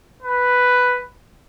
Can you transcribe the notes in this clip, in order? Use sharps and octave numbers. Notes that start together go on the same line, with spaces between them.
B4